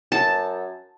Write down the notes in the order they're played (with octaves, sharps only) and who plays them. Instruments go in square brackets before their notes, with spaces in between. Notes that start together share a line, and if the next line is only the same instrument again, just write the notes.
[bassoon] F#2 [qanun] A5